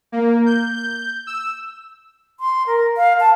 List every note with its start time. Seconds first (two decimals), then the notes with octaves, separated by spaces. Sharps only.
0.12 A#3
0.46 G6
0.75 G6
1.27 E6
2.40 C6
2.67 A#4
2.97 F5
3.20 A5